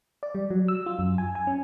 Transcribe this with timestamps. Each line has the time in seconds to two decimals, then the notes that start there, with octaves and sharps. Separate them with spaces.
0.23 D5
0.35 G3
0.50 F#3
0.68 E6
0.86 F4
0.99 F#2
1.18 G#5
1.35 G#5
1.47 C#4